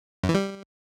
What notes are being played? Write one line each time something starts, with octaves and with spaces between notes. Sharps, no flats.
F#2
E3
G3